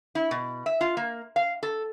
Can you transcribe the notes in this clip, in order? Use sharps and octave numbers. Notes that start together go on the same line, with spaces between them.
E4
B2
E5
F4
A#3
F5
A4